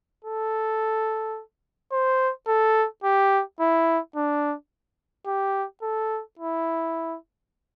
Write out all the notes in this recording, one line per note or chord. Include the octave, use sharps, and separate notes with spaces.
A4
C5
A4
G4
E4
D4
G4
A4
E4